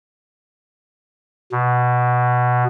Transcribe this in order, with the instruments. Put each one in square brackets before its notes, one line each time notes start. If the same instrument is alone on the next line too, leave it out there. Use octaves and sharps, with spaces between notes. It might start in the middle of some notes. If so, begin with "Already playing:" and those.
[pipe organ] B2